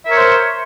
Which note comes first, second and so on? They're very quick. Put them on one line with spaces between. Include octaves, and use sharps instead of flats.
E5 A#4 C#5 C5